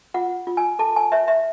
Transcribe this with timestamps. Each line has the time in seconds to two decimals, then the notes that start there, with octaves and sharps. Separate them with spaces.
0.14 F4 F#5
0.47 F4
0.57 G#5
0.79 A4 A5
0.96 G#5
1.12 C#5 E5
1.28 E5